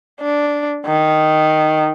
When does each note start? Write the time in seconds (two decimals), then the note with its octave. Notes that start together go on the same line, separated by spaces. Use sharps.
0.21 D4
0.86 D#3